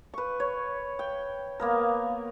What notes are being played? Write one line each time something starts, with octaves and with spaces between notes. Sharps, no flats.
B4 C#6
C#5
G5
A#3 B3 A#4